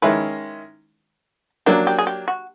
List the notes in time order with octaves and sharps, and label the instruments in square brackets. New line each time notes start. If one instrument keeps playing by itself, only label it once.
[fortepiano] D#3 G#3 C#4 E4 [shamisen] B4
[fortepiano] F#3 A#3 D4 [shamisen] G4
[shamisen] G4
G#4
G4
F#4